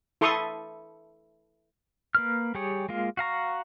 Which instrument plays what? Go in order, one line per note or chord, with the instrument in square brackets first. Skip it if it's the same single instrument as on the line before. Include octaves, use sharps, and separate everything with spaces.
[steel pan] E4 A4 C6 C#6 D#6
[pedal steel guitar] A#3 B4 F6
G3 G4 G#4 C#5
G#3 A#3 F4
F#4 F5 A#5 C#6